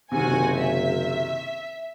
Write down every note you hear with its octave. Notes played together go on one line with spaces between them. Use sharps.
F#1 C3 D#3 F#4 C5 G#5
E5